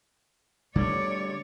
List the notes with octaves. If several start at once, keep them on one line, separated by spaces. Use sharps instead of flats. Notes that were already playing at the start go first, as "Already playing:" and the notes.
D3 G3 A3 C#5 D5